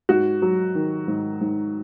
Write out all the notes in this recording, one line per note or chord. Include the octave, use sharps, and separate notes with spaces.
G#2 F#4
F#3
D#3
G#2
G#2